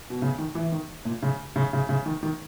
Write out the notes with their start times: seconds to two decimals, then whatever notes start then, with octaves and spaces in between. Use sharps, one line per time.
0.10 B2
0.22 C#3
0.38 D#3
0.55 E3
0.72 D#3
1.05 A#2
1.23 C#3
1.56 C#3
1.73 C#3
1.89 C#3
2.06 D#3
2.23 D#3